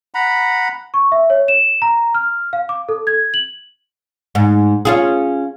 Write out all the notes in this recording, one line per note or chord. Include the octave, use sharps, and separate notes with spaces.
F#5 A#5 B5
C#6
E5
C#5
E7
A#5
F6
F5
D6
A4
G#6
F#7
G#2
C#4 F4 G#4